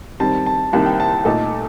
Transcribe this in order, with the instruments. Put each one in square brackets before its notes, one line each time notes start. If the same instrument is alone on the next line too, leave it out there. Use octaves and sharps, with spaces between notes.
[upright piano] D#3 G3 C4 [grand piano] A5
[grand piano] A5
[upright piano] C2 C3 D#3 A#3 [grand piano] A5
[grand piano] G5
A5
[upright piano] A#2 A3 D#4 A4 [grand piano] A5